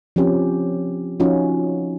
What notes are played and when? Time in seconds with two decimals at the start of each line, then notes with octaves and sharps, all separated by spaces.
0.16 F3 C4 C#4 G4
1.20 F3 C#4 D#4 F4 F#4